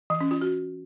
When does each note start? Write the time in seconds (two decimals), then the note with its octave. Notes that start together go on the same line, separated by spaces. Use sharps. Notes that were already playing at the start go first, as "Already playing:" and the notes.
0.10 E3
0.21 C#4
0.31 F4
0.41 F#4